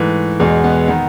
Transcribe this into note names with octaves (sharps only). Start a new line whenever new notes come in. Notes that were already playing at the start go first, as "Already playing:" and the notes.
Already playing: G#2 E3 A3
E2 B2 G#3
B3
D#3 B3